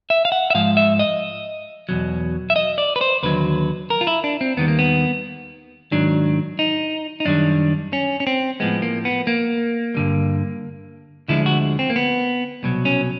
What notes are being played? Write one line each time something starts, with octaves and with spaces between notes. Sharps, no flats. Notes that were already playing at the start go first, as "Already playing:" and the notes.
E5
F5
F#5
E5
G#2 F3 G#3 F5
E5
D#5
E2 B2 F#3
E5
D#5
D5
B4
C5
D#2 D3 F#3 B4
A#4
F4
E4
D4
C4
D#2 D#3 G3 B3
A#3
B3
G#2 D#3 F#3 D4
D#4
D#4
F#2 D#3 G3 D4
C#4
C#4
C4
A2 F3 G#3 B3
A#3
B3
A#3
G2 D3 G3
D2 D3 F3 G#3 E4
F#4
C4
A#3
B3
C2 B2 F#3
C#4